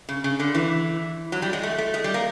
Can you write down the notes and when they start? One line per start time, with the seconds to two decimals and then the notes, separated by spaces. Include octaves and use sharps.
0.09 C#3
0.24 C#3
0.40 D3
0.55 E3
1.32 F#3
1.42 G3
1.53 G#3
1.63 A3
1.78 A3
1.94 G#3
2.04 G3
2.14 A#3